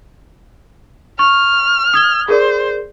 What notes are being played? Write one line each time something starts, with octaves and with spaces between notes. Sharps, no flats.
C#6 F6
D#6 G#6 G7
G#4 A#4 C5 D5